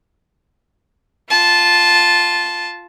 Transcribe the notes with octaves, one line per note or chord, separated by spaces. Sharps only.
F4 A5